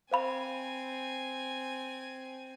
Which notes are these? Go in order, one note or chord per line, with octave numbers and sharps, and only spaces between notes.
C4 C5 F5 G#5 B5